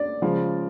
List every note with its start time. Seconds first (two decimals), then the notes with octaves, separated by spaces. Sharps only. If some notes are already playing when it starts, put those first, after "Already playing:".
Already playing: D5
0.22 C#3 F3 G#3